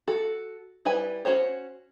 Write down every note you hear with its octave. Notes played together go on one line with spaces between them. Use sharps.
F#4 A4
G3 E4 B4 G#5
C#4 E4 F#4 C5 C#5